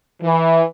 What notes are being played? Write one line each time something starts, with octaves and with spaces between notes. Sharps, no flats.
E3